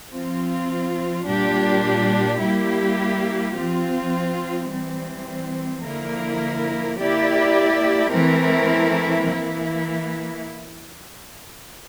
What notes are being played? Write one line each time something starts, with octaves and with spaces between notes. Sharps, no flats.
F3 C4 F4
A#2 G3 D4 G4
G3 A#3 E4 G4
F3 C4 F4
E3 G3 C4
D3 F3 A#3 E4 A#4
A#3 E4 G4 D5
E3 A3 C4 E4 A#4
E3 A#3 E4